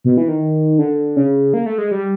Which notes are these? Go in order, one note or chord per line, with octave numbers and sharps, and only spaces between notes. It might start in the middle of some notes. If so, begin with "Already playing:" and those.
B2
E3
D#3
D3
C#3
A#3
A3
G#3
G3